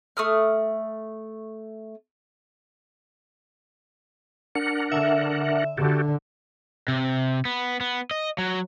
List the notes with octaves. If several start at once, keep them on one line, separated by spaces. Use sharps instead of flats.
A3 D#6 F6
D4 A#4 F#5 C#7
D3 E5
D3 F#4 G4 A4
C3
B3
B3
D#5
F#3